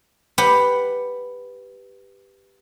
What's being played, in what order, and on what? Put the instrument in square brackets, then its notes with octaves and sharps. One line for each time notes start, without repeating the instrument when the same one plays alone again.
[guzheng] G4 B4 F#5